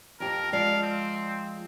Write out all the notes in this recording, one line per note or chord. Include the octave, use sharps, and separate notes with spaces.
F2 G4 A#4
F3 G#3 D5 F5
C4